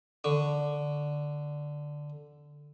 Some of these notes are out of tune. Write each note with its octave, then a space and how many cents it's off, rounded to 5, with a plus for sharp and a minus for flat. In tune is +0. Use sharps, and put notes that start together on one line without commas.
D3 +0 C#6 +0